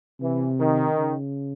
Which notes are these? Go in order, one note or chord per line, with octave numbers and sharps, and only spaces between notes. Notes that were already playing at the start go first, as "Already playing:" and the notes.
C3 E3
D#3
C#3